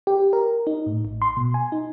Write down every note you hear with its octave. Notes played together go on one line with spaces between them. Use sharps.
G4
A#4
D#4
A2
A1
C6
B2
G#5
D#4